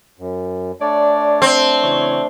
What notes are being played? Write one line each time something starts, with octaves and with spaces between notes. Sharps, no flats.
F#2
A3 D4 C#5 D5
C4
C#3 E3 C#5